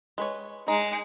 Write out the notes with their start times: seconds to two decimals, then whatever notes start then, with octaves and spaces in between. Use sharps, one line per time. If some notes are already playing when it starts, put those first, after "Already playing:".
0.18 G#3 B4 C#5
0.68 G#3 D#4